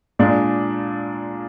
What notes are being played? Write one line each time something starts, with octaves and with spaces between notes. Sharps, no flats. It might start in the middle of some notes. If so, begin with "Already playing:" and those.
A#2 G#3 D4